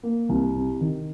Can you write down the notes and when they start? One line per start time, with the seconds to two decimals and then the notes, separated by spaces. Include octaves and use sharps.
0.03 A#3
0.29 C2
0.56 C3
0.81 D#3